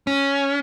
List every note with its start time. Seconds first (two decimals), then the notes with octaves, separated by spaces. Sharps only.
0.07 C#4